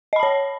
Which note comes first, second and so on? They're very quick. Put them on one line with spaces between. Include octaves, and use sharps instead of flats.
D#5 B5 A5 C#5